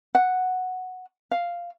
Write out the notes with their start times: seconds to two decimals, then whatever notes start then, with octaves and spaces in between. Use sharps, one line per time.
0.15 F#5
1.31 F5